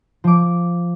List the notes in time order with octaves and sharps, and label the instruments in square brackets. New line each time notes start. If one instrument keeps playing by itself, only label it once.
[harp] F3 D6